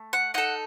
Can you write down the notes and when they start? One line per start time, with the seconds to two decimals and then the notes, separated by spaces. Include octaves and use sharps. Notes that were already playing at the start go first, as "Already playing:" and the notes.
Already playing: A3
0.13 F#5
0.34 D#4 A4 F#5